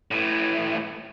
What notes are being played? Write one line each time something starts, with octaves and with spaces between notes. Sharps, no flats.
A2 E3